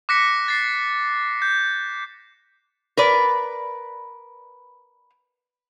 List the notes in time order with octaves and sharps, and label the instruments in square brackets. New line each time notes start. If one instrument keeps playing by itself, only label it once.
[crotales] D6 F#6 A#6 B6 C#7
A6 C7
G6
[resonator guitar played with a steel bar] A#4 B4 D5